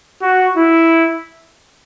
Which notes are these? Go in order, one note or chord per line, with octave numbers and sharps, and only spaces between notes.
F#4
E4